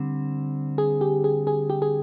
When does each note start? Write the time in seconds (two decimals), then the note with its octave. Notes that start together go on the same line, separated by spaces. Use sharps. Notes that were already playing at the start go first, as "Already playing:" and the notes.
Already playing: D3 G3 C4
0.78 G#4
1.01 G4
1.24 G#4
1.47 G#4
1.70 G4
1.82 G#4